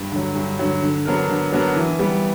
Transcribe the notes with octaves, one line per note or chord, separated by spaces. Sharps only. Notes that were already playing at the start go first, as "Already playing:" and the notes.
Already playing: G2
D3 F#3
G2
D3 F#3
D3
F#3 B3 D4 A#4
D3
F#3 B3 D4 A#4
E3
G3 B3